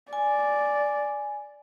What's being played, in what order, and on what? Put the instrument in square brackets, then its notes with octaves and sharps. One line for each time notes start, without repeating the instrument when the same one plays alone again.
[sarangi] D5 [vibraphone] G#5